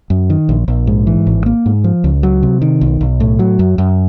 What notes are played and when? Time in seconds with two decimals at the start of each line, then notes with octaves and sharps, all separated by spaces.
0.10 F#2
0.30 D#3
0.49 A#1
0.68 A#1
0.87 G#2
1.07 E3
1.27 G#1
1.46 A#3
1.66 G#2
1.84 F3
2.04 C#2
2.23 F#3
2.43 C3
2.62 D#3
2.81 B1
3.01 B1
3.20 A2
3.39 F#3
3.59 F#2
3.78 F#2